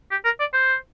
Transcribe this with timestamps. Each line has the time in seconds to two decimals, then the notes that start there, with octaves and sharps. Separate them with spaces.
0.11 G4
0.24 A#4
0.40 D5
0.53 C5